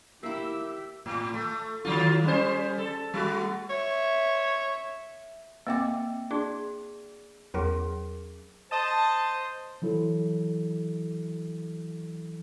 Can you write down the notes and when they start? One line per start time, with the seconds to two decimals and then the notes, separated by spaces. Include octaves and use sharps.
0.23 A#3 E4 G4 E5 E6
1.06 A2
1.34 A3
1.85 D#3 F#3 F4
2.24 G3 C#4 C5
2.78 A4
3.14 G3 F#4
3.70 C#5 E5
5.67 A#3 C4 D#5 E5 G5 D6
6.31 D4 F#4 G#4 D5
7.54 E2 F#3 C#4 F#4 G#4 A#4
8.71 C5 D#5 A5
9.82 E3 F#3 E4 A4